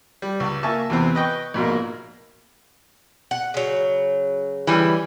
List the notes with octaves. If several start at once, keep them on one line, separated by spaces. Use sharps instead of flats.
G3
C#2
A#3 E5 G#5 A5 C#6
E2 C3 E3 B3 C4
B4 D#5 G5 C#6
A#1 G#2 B2 A#3
F#5
C#3 F#3
E3 G3